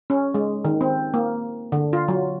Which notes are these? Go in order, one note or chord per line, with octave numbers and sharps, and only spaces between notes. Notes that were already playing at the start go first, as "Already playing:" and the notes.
C#4
G#3
D#3
C4
A#3
D3
F4
F#3